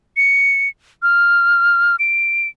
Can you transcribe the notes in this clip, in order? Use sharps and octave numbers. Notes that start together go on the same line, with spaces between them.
C#7
F6
D7